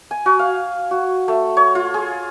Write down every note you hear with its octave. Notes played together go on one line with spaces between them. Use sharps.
G#5
F#4
F5
F#4
A3
C#5
F4
G#4